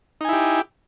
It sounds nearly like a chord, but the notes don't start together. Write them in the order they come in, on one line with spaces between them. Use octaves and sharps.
D#4 G#5 E4 G4